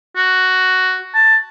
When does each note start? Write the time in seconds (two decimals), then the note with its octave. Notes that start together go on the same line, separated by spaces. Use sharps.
0.16 F#4
1.15 A5